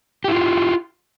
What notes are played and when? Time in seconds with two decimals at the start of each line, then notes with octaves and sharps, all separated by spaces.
0.24 G4
0.28 E4
0.32 F4